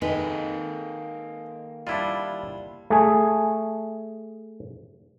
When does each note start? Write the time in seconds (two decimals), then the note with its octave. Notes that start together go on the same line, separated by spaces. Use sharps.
0.02 D#3 G#3 A#3 D#4 A4 B4
1.87 G3 D4 E4 F4
2.90 A3 G#4